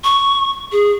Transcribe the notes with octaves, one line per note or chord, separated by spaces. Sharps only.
C#6
G#4